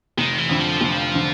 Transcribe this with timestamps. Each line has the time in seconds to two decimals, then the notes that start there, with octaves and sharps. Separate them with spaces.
0.17 F1 D#3
0.39 E3
0.49 F2 D3
0.60 F3
0.81 F1
1.15 D3